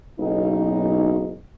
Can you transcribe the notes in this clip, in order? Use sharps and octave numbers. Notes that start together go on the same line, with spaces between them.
F#1 B1 D#4